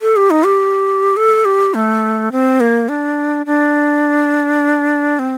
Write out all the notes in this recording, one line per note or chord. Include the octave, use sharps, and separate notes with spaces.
A4
G4
D#4
G4
A4
G4
A3
C4
A#3
D4
D4
C4